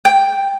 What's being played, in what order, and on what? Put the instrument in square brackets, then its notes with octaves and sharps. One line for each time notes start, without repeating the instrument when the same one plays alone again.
[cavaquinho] G5